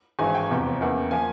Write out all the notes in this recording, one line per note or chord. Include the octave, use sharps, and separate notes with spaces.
G#1 G2 E3 G#3 G#5
G5
F1 E2 C3 F3
E2 C#3 E3 A#3 E4
F3 A#3 G#5